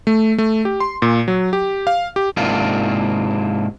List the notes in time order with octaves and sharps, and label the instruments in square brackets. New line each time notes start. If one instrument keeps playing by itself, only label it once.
[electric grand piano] A3
A3
G4
C6
A#2
F#3
G4
F5
G4
[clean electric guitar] G#2 C3 A#3 D4 E4 F4